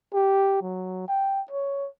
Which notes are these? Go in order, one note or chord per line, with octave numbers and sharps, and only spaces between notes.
G4
F#3
G5
C#5